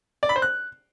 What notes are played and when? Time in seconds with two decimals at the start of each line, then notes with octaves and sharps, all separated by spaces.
0.23 D5
0.29 B5
0.36 C5
0.42 F#6